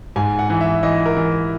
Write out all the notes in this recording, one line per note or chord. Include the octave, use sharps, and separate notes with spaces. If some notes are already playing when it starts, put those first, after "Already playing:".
G#2 G#5
F#5
E3
E5
E3 D#5
A#4
E3